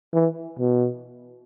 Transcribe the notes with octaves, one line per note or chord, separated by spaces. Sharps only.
E3
B2